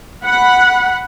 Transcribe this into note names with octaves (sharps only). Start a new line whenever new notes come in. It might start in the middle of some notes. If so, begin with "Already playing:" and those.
F#5 B5